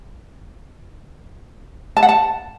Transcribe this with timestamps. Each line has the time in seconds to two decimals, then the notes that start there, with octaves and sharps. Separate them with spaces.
1.97 A5
2.03 F#5
2.09 A5